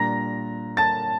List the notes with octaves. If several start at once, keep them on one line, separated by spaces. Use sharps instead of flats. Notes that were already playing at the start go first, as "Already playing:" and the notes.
Already playing: A#2 G3 D4 A#5 A#6
A5 A6